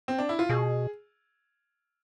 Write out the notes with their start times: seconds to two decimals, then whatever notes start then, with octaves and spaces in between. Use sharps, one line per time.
0.08 C4
0.18 D4
0.29 E4
0.39 F4
0.49 B2 G#4